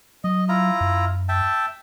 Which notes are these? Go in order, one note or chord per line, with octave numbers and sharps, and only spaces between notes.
F#3 D#5
E4 F4 A#5
F#2
E5 G5 A5